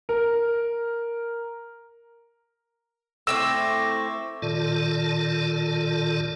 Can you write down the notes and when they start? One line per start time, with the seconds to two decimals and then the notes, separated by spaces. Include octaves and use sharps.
0.09 A#4
3.27 A3 C4 E4 C#6 D6 E6 A#6
4.42 A#2 D#3 F4 A4 D5 A5